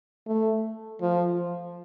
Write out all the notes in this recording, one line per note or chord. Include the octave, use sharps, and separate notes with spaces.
A3
F3